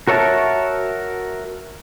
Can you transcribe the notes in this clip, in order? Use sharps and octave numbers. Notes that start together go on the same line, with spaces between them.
F#4 A#4 C#5 E5 A5